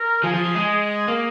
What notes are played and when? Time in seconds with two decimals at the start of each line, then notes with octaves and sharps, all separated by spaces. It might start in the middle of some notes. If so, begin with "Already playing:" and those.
Already playing: A#4
0.23 F3 G#4
0.34 F3
0.45 F3
0.55 G#3
0.66 G#4
1.08 A#3